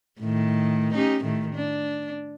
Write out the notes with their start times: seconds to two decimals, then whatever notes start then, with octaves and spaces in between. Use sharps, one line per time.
0.20 A2 D#3
0.94 C#4 D#4 G4
1.24 A2 D#3 A3
1.54 D4